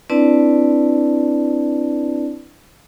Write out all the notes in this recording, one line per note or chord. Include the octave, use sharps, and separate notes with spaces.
C4 D4 E4 B4 D5 A5